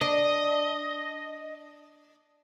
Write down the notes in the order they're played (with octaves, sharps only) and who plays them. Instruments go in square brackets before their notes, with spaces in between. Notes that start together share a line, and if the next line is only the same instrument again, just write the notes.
[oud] D4 [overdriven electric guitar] D#5